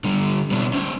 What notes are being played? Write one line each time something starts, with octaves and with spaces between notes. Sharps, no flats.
D3 G3
B2 G3 B3 C#4 D4 E4
C#4 C5